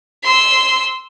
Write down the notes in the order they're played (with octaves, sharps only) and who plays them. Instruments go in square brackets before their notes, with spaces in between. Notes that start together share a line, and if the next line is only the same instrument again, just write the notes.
[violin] C6 E6